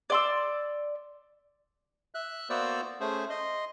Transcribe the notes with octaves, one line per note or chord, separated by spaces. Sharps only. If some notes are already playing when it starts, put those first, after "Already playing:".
D5 C6 E6
E5 F#6
A#3 B3 F#4 C5 D5 E6
A3 C#4 G#4 C5
D#5 C6